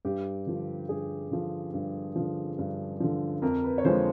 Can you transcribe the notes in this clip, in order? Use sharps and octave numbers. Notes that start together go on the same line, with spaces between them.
G2 G4
D3 F3
G2 G#4
D3 F3
G2
D3 F3
G2
D3 F3
F2 A#4
B4
C#5
D3 F3 G#3 C5